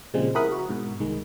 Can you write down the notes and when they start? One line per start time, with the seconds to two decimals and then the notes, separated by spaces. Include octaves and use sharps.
0.14 A#2 C#3 F3 G3 G#3 C4
0.35 E4 G#4 A#4 F#5 B5 D#6
0.52 F#4
0.69 G#2 B2
1.00 C2 D#3 G#3